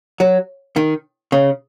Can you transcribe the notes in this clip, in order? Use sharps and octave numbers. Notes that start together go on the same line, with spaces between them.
F#3
D#3
C#3